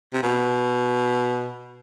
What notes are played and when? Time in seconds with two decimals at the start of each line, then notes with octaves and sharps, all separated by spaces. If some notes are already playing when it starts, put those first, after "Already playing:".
0.13 C3
0.23 B2